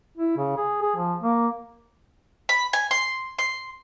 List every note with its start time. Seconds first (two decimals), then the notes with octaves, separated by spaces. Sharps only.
0.17 E4
0.37 C#3
0.57 G#4
0.82 G#4
0.96 F3
1.21 A#3
2.49 B5
2.73 G#5
2.91 C6
3.39 C6